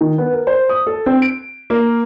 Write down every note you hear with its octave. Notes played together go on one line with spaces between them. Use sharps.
D#3
B3
A#4
C5
D#6
A4
C4
D7
A#3